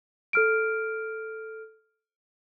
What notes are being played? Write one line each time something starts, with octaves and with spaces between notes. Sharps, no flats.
A4 F6 D7